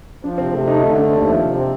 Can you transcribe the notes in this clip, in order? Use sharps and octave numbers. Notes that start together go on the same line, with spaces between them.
F3 D4
C3 C4
C3 A3
A3 D#4
D3 D#4
A3 D4
D#2 C4
F3
C3
C4